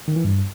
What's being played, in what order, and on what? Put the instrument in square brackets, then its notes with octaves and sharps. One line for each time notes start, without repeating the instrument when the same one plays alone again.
[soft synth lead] D#3
E3
G2